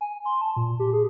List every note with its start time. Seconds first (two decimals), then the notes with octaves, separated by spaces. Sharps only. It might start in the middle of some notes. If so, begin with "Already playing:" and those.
0.01 G#5
0.25 C6
0.41 A5
0.56 A#2
0.80 G4
0.93 G#4